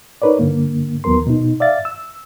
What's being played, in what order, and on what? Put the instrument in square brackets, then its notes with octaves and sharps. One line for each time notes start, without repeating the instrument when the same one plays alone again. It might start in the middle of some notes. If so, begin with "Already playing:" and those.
[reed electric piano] D#4 A#4 B4 C#5 D5
G2 D3 A#3
D#2 F#3 B3 A#4 C6
B2 D#4
D5 E5 F5 A6
E6